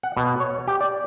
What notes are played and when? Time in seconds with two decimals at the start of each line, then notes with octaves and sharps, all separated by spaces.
0.03 F#5
0.17 B2
0.40 C#5
0.68 G4
0.81 D5